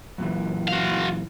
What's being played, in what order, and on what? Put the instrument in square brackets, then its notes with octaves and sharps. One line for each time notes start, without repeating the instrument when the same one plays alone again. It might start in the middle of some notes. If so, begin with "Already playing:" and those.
[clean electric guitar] F#2 A#2 E3
[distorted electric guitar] F#4 F5